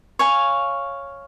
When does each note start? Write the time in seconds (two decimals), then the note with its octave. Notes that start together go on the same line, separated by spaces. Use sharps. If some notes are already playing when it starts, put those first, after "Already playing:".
0.19 C#5 F5 G#5